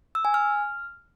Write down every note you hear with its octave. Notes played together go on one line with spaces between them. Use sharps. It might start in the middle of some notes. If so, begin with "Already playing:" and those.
E6
G#5
F6